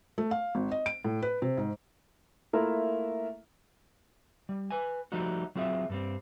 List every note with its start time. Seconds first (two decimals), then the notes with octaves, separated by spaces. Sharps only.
0.18 A3
0.31 F5
0.55 G#1
0.71 D#5
0.86 D7
1.05 A2
1.22 B4
1.42 C3
1.57 G#2
2.53 A3 A#3 E4 F4 A#4 E5
4.49 G3
4.71 B4 G#5
5.12 F3 G3 A3 D#4 F#4
5.55 F#3 C4 F4 G#4 E5
5.90 G2 G3 C4